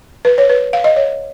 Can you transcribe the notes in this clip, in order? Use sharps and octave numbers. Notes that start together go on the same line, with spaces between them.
B4
C#5
B4
F5
D#5
C#5